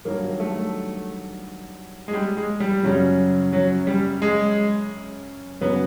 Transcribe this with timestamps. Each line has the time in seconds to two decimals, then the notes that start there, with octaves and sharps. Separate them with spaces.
0.05 G2 D#3 F#3 A#3
0.40 A3
2.08 G#3
2.13 G3
2.37 G#3
2.60 G3
2.83 F#2 C#3 F#3
3.53 F#3
3.87 G3
4.22 G#3
5.61 F#2 C#3 F#3 B3